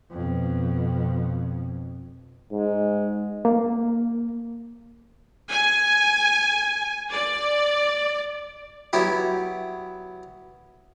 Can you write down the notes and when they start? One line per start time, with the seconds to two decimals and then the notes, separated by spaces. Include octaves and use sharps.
0.11 F2 B2
2.52 G#2 G#3
3.45 A#3
5.50 G#5
7.12 D5
8.93 F#3 B3 E4 G4